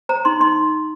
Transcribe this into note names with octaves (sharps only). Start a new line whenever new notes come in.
C5 A#5
D#4 C6
D#4 C6